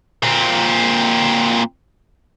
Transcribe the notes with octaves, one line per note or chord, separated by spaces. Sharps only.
A#2 C4